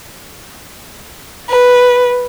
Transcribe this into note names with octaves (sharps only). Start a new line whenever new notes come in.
B4